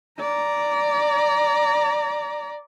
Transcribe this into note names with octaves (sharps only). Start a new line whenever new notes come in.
D5 A#5